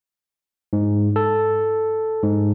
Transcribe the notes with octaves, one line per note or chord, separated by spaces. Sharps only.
G#2
A4
G#2